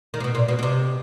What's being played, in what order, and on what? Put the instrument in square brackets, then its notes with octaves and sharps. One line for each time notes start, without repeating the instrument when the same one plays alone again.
[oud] D#3
C3
B2
A#2
B2
B2
C3